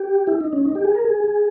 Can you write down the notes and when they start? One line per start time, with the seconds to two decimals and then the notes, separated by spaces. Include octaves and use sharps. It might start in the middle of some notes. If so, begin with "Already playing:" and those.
Already playing: G4
0.27 E4
0.41 D#4
0.53 C#4
0.65 D#4
0.75 G4
0.85 G#4
0.95 A#4
1.04 G#4
1.24 G#4